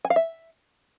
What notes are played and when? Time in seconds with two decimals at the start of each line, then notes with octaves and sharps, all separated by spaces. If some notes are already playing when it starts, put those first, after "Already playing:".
0.05 G#5
0.10 F5
0.16 E5